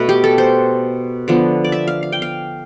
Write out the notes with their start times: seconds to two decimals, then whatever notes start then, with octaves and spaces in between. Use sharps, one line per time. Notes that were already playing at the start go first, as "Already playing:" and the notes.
Already playing: B2 A3 B4
0.09 G4
0.24 A4
0.38 C5
1.28 D3 F3 B3
1.64 D5
1.72 E5
1.88 F5
2.03 F5
2.12 G5
2.22 F5